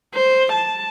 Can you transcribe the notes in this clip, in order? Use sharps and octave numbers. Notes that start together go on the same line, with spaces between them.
C5
A5